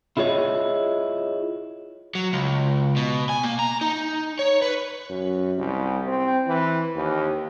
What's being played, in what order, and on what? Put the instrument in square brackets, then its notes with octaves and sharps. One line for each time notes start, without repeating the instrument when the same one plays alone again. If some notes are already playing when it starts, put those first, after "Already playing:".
[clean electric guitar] E4 F4 G#4 B4 C#5 D#5
[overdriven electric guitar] F#3
C#2
B2
G#5
A#3
A#5
D#4
C#5
B4
[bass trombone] F#2
C2
C4
E3
D#2